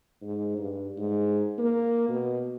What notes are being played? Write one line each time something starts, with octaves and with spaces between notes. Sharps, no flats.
G#2
G2
G#2
A#3
B2